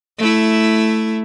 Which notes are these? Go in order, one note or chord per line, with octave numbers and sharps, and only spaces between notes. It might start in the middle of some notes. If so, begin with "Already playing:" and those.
A3 E4